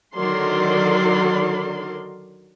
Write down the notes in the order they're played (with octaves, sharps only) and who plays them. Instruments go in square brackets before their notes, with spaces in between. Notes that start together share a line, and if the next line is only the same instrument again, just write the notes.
[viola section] D3 D#3 F#3 A#4 D5 C6